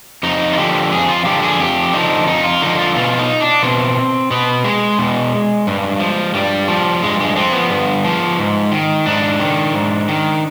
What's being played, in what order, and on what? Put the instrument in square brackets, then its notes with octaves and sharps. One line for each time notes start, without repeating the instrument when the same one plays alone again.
[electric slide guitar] F2 D#4
F4
D3 F3 G4
F2 G#4
F4
D3 F3 G4
G#4
F2 G4
D3 F3 D#4
F2 D#4
F4
D3 F3 D#4
F4
B2 F4
D#4
D4
B2 C4
B2 B3
G#3
B2
G2
F3
G2 G3
F3
G2 G#3
G#3
F3 C4
B3
G2
F3
G#2
D#3
G#2 D4
D#3
G#2
D#3